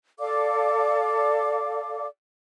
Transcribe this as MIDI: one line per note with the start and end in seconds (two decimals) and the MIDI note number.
0.20 2.07 69
0.20 2.07 74
0.20 2.07 77
0.20 2.07 86